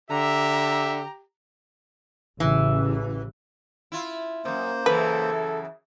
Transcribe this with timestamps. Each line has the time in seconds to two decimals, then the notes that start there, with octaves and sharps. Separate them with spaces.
0.10 D3 G4 E5 A#5
2.40 A1 C#3 E3
3.92 E4 F4
4.45 F#2 C3 A#3 C5
4.86 F#2 C#3 E3 A4 B4